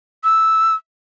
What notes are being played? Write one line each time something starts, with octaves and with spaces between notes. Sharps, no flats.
E6